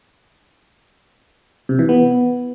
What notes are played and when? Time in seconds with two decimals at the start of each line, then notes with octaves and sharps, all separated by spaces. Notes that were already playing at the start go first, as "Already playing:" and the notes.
1.69 C3
1.79 E3
1.89 B3